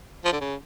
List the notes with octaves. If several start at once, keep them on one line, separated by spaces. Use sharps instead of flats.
F3
D3
C#3